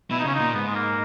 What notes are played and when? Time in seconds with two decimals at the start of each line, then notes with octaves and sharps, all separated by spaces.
0.11 B2 E4
0.19 D#4
0.25 C#3 C#4
0.35 A#2 D#4
0.54 G#2 B3
0.67 G#3
0.75 A#3